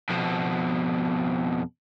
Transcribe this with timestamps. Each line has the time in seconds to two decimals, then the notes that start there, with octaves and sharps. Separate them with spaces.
0.10 F2 B2